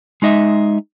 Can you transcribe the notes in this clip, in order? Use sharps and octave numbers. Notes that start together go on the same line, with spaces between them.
G#3 D#4 D#5 E5